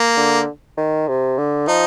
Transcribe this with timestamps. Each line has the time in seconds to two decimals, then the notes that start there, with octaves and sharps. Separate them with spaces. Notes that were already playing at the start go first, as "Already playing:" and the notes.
Already playing: A#3
0.17 D3
0.77 D#3
1.08 C3
1.38 D3
1.68 F3 D#4